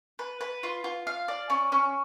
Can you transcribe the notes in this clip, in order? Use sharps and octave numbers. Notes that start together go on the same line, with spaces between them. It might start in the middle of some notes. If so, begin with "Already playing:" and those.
B4
B4
F4
F4
F5
D5
C#4
C#4